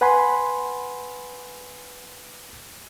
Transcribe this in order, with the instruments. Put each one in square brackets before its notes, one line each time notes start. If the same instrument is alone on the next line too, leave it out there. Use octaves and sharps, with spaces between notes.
[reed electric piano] B4 F#5 G#5 B5 C6